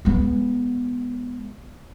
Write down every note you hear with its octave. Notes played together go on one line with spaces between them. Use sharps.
G#3 B3